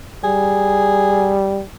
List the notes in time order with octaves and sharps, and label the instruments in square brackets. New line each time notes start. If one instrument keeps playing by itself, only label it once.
[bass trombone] G3 [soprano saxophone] G#4